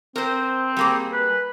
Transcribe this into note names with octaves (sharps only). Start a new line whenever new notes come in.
C4 A#4 C5
G3 A#3 G#4
B4